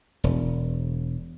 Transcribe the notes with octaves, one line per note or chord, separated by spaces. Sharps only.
E1